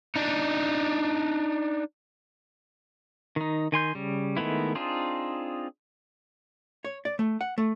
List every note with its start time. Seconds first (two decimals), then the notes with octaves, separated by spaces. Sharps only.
0.16 D4 D#4
3.36 D#3 D#4
3.72 D#3 G#5 C6 G6
3.95 C#3 G3
4.37 D#3 G#3 A3 B3 E4
4.75 C4 D4 D#4 F4 G#4
6.85 C#5
7.05 D5
7.19 A3
7.41 F#5
7.58 A3